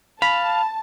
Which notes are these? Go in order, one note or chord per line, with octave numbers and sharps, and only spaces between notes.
F5 A5 B5